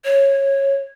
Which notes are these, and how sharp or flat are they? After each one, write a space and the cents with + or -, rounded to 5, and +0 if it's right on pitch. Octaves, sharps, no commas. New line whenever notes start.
C#5 -15